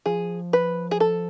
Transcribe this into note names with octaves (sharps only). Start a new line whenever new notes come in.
F3 G#4
B4
G#4
A4